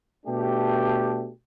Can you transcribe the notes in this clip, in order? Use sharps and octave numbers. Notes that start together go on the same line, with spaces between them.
B2 A3 D4 G4